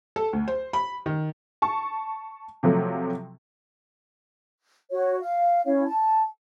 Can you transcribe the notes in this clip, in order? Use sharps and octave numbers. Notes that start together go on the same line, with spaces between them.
A4
D2
C5
B5
D#3
A5 C#6
C3 F3 F#3 A3
F#4 C#5
F5
C#4 E4 C#5 F5
A5